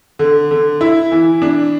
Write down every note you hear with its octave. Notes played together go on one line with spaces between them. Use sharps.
D3
D3
E4
E3
D4